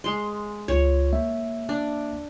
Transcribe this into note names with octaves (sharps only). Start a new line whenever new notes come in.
G#3 C6
C#2 F4 C#5
A#3 E5
D4